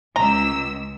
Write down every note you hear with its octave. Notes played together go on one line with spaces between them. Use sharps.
C#2 A#5 E6